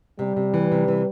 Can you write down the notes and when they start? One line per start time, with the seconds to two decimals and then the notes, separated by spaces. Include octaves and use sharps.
0.19 C3 G3
0.36 C3
0.54 E3
0.71 C3
0.88 E3